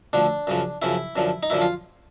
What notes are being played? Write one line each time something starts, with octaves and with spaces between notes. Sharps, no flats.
D2 D3 F3 D4
F#2 C#3 F3
F#2 C#3 F3 E4
F#2 D3 F3
D#4
F#2 D3 F3 E4
F4